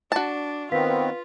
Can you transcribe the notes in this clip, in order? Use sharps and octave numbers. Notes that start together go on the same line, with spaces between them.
D4 F#4 A5
D#3 B3 C4 F4 B4 F5 B6